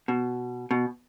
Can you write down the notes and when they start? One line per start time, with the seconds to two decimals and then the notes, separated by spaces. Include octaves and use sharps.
0.08 B2
0.71 B2